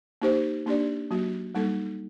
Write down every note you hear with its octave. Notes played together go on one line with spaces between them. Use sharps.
A#3 D#4 G4 C5
A#3 D4 G4 D5
F#3 A#3 F#4
G3 A#3 D#4 A4